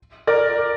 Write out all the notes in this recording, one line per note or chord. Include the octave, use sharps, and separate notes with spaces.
A#4 D5